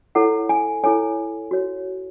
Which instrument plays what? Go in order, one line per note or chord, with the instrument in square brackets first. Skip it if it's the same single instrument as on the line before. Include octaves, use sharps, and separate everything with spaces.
[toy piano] E4 A4 C#5 F#5
G#5
E4 A4 C#5 G#5
F#4 C#5